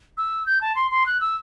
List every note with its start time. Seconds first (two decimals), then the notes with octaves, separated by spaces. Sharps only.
0.17 E6
0.46 G6
0.61 A5
0.75 C6
0.91 C6
1.06 F#6
1.21 E6